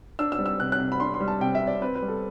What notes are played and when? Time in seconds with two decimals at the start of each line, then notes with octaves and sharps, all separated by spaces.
0.19 D4 E6
0.32 E6
0.39 G3
0.46 E6
0.60 C3 F#6
0.72 F#6
0.79 C3
0.92 B5
1.00 D4 C6
1.14 C6
1.20 G3
1.28 A5
1.40 C3 G5
1.55 E5
1.60 C3
1.67 D5
1.81 C4 B4
1.95 B4
2.02 G3
2.08 A4